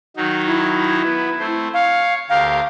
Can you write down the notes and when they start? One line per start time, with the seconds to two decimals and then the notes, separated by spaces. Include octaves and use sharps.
0.17 D#3 F#3 D#4
0.47 E4
1.04 B3
1.39 A3 C4 C5
1.74 C#5 F5
2.30 D2 G4 A#4 F5